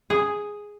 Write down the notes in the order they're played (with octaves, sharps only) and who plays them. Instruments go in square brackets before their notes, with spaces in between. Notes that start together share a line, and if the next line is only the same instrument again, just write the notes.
[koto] G#4